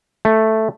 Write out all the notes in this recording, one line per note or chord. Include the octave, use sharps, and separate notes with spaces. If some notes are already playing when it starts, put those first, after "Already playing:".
A3